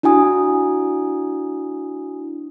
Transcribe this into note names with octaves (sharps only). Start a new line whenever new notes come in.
D4 E4 F#4 G#5 D#6